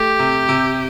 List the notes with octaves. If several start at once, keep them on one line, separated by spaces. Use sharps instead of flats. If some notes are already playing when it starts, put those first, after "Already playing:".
Already playing: A3 G4
C3
C3